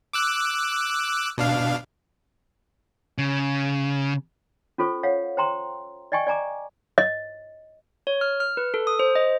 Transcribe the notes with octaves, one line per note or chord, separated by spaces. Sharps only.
D6 E6 F#6
B2 D4 F5
C#3
C#4 F4 A4 C5 C#6
C#5 F5 F#5
C5 G5 A#5 C6
D5 D#5 G5 G#5 C#6
D5 G#5 A#5 D6
D#5
C#5
F6
F6
B4
A4
D#6
C5
D#5